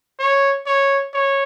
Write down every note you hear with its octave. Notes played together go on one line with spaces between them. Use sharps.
C#5
C#5
C#5